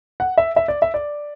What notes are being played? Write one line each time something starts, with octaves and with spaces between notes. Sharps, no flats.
F#5
E5
E5
D5
E5
D5